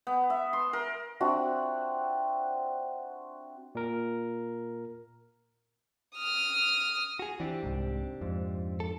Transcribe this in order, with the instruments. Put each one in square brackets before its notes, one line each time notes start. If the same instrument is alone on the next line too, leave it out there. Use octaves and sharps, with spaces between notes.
[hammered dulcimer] B3
E5
C6
A#4
[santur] C4 D4 F#4 E5
[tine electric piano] A#2 A#4
[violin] D#6 F6
[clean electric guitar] F#4 G#4
[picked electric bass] E3 [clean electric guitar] C4 D4 G4
[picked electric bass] C2 G#2
F2 G#2
[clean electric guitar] A4